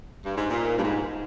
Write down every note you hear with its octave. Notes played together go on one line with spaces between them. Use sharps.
G2
G#2
A#2
G2
G#2